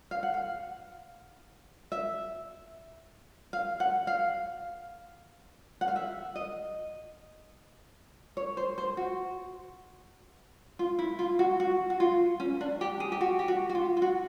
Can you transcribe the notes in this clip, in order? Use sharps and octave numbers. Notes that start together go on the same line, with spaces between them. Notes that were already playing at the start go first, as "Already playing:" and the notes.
F5
F#5
F5
E5
F5
F#5
F5
F#5
F5
E5
D#5
C#5
C5
C5
F#4
F4
E4
F4
F#4
F#4
F#4
F4
C#4
D4
G4
G#4
G4
F#4
G4
F#4
F#4
F4
F4
F#4